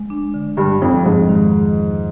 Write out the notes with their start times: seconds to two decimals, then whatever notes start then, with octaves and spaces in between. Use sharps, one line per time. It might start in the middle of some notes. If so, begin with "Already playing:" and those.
Already playing: G#3
0.10 D4
0.34 D3
0.57 G2 D3
0.82 F2 F3
1.05 F2 G#2
1.29 D#3